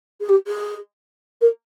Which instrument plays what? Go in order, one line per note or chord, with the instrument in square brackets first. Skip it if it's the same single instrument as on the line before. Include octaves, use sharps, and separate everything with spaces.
[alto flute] G#4
G4
G#4
A#4